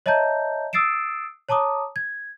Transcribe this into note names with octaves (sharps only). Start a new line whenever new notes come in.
C#5 D#5 E5 A5 A#5 G6
D#6 E6 A6 C7 D7 E7
C#5 A5 A#5 D6 D#6
G#6